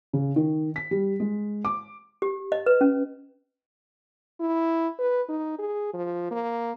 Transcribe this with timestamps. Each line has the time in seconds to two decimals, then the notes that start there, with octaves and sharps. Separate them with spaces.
0.13 C#3
0.36 D#3
0.76 B6
0.91 G3
1.20 G#3
1.65 D6
2.22 G4
2.52 D#5
2.66 B4
2.81 C#4
4.40 E4
4.99 B4
5.29 D#4
5.58 G#4
5.94 F3
6.31 A#3